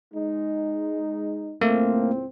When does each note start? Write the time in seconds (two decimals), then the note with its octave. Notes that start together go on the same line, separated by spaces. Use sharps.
0.13 G#3 D#4
1.61 C#2 A2 A3 A#3 C4